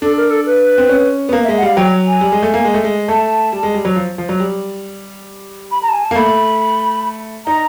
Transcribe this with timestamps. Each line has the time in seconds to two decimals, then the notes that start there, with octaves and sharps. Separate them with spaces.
0.02 D4 A4
0.17 A#4
0.30 A4
0.46 B4
0.78 C4
0.89 C#4
1.29 B3
1.33 A#3
1.44 E5
1.48 G#3
1.57 F#5
1.62 G3 F5
1.76 F#3 G5
2.07 G#5
2.21 G3
2.32 G#3
2.43 A3
2.54 A#3
2.65 G#3
2.74 A3
2.84 G#3
3.08 A3 A5
3.53 G3
3.63 G#3
3.74 G3
3.85 F#3
3.96 F3
4.18 F3
4.29 F#3
4.40 G3
5.71 B5
5.83 A#5
5.89 A5
5.93 G#5
6.04 A5
6.11 A#3
6.16 A3 B5
7.46 D#4 A#5